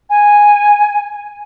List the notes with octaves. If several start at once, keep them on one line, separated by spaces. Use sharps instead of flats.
G#5